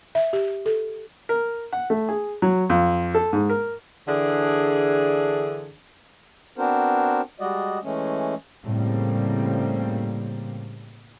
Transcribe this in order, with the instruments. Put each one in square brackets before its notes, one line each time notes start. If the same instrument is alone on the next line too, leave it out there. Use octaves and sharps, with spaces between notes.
[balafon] E5
G4
A4
[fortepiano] A#4
F#5
A3
G#4
F#3
F2
A4
G#2
A#4
[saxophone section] D3 E3 D4 G#4
[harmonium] B3 C4 D4 F#4 A#4 C5
G3 G#3 F#4 D5 D#5
E3 G#3 A3 C#4
[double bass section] A2 C#3 G3 A#3 C4